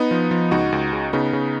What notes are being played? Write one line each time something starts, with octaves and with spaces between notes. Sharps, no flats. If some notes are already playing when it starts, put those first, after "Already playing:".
Already playing: B3 D#4
F3
F3
C#2 D#4 F#4
C#2
C#3
C#3 B3 D#4
C#3